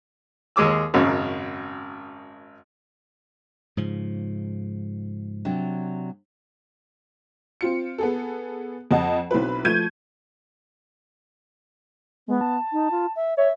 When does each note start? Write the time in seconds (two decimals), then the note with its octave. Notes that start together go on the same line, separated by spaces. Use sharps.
0.56 D#2 G#3 G#4 D6 E6
0.94 G#1 F#2 C#3
3.77 G#2 C#3 F3
5.45 C3 F#3 D4
7.61 C4 F4 C#7
7.98 B3 G#4 A4
8.91 F2 D#5 F#5 A5
9.31 B1 C4 E4 B4
9.65 F3 A3 G6 G#6 D#7
12.28 G#3 B3
12.41 A5
12.72 D#4
12.91 F4
13.16 E5
13.37 C#5 E5